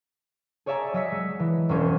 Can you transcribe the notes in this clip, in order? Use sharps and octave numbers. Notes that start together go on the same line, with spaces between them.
G#4 C#5 D5 E5 G#5 A#5
F#3 D#5 E6 B6 C#7
G#3
E3
E1 F#3 C#4 G#4 C5